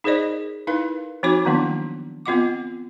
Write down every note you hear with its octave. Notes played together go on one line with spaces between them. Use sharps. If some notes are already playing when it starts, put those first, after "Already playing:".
D#4 G#4 A#4 C5 D5 D#5
D#4 E4 A#4 B4 F5
F3 C4 D#4 F#4 C#5 D6
D#3 F#3 A#3 B3 D4 E4
B3 C4 F4 D#5 F#5 D6